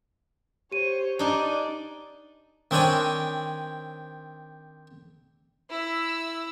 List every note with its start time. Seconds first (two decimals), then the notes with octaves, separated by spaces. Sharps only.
0.72 G4 C5 C#5 D#7
1.19 D4 D#4 D5 G#5
2.71 D#3 C4 D4 C#5 G#5
5.70 E4 E6